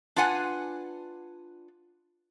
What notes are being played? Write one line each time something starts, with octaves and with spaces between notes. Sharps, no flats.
D4 F4 B4 F#5 G#5